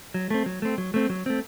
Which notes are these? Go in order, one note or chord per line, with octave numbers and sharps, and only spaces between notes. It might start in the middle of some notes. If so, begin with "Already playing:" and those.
F#3
A3 C4
F#3
A3 C4
F#3
A3 C4
F#3
A3 C4